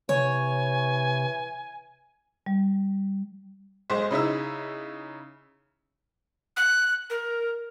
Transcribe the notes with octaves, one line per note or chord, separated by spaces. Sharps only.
C3 E3 C#5 G#5
G3
B1 G#3 C5
C#3 D#4 E4 E6
F#6
A#4